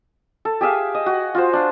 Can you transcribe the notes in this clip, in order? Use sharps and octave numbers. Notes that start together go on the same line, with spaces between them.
A4
G4 G#4 E5 F5
D#5
F#4
F4 F#4 C5
D4 F5